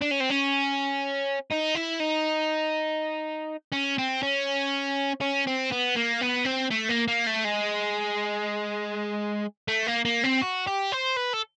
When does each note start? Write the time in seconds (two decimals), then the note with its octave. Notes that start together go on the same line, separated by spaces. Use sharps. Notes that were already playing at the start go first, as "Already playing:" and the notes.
0.02 D4
0.11 C#4
0.21 C4
0.30 C#4
1.51 D#4
1.75 E4
2.00 D#4
3.73 C#4
3.98 C4
4.23 C#4
5.21 C#4
5.47 C4
5.71 B3
5.96 A#3
6.21 B3
6.45 C4
6.71 A3
6.89 A#3
7.08 A#3
7.27 A3
7.45 G#3
9.68 A3
9.87 A#3
10.05 A#3
10.24 C4
10.42 F#4
10.67 G4
10.92 C5
11.16 B4
11.34 A4